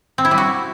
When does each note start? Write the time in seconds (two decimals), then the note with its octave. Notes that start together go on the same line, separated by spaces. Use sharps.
0.18 C4
0.25 E4
0.31 G3
0.38 F#4